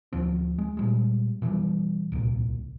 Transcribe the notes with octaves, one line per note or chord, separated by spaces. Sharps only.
D2 F3 C4
G#3
A#2 G3 G#3
B2 E3 F#3 G3
D1 C2 A#2